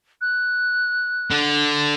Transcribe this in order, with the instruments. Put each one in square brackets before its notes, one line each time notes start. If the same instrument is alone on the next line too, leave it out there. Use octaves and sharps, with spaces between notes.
[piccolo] F#6
[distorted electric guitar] D3